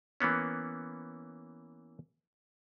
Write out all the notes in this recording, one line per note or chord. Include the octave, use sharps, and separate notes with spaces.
E3 A#3 B3 C#4